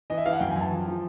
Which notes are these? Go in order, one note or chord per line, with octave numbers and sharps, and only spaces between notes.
E3 D#5
E5
E3 F5
F#5
F#2 G5
F#2 G#5
A5
F3
F3